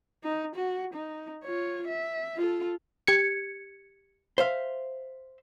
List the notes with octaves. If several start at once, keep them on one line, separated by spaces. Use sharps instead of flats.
D#4
F#4
D#4
F4 C#5
E5
F4 A4
G4 G#6 C#7
C5 E5 F5